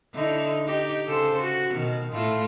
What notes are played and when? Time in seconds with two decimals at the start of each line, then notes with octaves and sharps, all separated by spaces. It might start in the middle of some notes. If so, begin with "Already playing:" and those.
0.14 D3 D#4 E4
0.67 D#4 G4
1.07 C#3 A4 C5
1.40 F#4
1.72 B2 D#3
2.11 A2 A3 F4